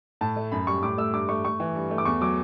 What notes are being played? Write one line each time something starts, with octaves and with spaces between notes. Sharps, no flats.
A2 A5
A3
F#2 B5
G3 C#6
A2 D6
A3 E6
G2 D6
A3 C#6
A3 C#6
E3
G2
A3
D6
E2 C#6
F#3 D6